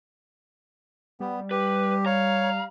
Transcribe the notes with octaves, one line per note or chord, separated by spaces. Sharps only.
G3 B3
G4 B4
C#5 F5 A#5